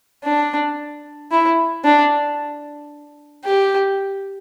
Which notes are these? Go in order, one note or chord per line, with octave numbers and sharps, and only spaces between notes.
D4
E4
D4
G4